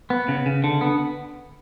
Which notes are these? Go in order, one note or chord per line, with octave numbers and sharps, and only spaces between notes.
B3
C#3
C#3
D3
B3